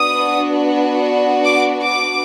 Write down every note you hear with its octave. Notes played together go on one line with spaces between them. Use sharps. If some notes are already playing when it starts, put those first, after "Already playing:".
Already playing: B3 D4 F#4 D#6
D6
D6